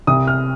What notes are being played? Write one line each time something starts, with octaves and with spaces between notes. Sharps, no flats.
C2 D#6
F6